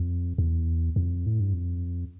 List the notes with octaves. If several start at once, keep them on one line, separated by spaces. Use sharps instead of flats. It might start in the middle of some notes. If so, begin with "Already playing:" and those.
Already playing: F2
E2
F2
A2
G2
F2